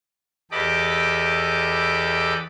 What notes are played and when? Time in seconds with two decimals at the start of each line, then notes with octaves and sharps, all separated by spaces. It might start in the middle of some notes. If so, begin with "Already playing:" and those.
0.51 E2 G4 A4 D#5 B5 D6